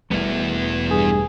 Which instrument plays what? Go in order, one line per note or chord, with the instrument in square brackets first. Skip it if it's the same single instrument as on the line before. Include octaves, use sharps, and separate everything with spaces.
[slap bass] E1 G3 A3 [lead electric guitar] B3 E4
[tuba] G2 [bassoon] G#4